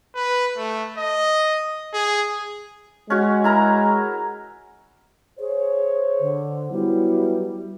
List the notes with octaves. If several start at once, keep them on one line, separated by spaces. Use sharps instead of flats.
B4
A3
D#5
G#4
G#3 C#4 F#4
E4 A#4 A#5
G#4 C5 C#5
D3
F#3 G3 B3 E4